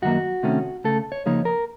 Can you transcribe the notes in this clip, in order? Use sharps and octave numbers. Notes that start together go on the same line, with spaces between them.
F#2 D#3 F#3 A#3 F#4
C3 D#3 A3 C#4
C#2 C#3 A3 A4
C#5
C#3 F3 A#3 D#4 C#5
A#4